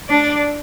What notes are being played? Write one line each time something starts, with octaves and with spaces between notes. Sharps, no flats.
D4 D5